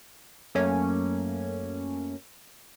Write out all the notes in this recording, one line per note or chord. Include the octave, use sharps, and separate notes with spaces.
F#2 A3 A#3 C#4